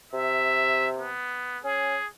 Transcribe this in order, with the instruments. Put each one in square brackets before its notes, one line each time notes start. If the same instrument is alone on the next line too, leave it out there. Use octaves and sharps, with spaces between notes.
[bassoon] C3 [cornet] E5
[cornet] B3
[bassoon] C#4 [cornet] G#4